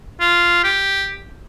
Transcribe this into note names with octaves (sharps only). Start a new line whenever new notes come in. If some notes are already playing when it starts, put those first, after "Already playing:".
F4
G4